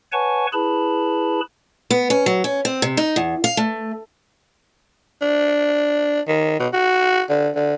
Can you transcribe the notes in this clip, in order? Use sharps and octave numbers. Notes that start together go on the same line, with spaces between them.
B4 C#5 F#5 G#5 A5 C#6
E4 G#4 B4 A5 B5
B3
C#4
F#3
C#4
C4
C3
D#4
E2
F5
A3
D4
D#3
B2
F#4
D3
D3